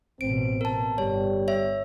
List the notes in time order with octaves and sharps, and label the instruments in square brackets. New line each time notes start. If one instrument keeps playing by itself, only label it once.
[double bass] A1 B2 [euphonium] C4 [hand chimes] D7
[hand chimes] A#4 A5
[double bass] G1 [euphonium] G3 [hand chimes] C#5
[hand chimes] C#5 E5